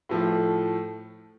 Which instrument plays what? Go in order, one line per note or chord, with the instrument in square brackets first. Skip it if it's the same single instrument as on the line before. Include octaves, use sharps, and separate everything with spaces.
[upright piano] A2 F3 A3